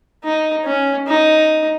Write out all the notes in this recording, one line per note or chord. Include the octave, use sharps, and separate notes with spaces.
D#4
C#4
D#4